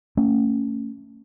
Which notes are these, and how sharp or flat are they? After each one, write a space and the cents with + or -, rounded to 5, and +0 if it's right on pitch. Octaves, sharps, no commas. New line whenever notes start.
A3 +35 C#4 +0